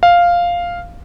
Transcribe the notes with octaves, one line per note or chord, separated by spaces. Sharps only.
F5